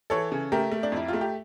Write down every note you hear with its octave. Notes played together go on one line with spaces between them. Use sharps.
E3 A4 C#5
C#3
A3 G4 A#4
A3
D4
F2 E4
A3 F4
G4